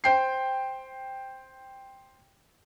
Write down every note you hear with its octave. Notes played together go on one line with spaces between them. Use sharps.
C5 G5 C7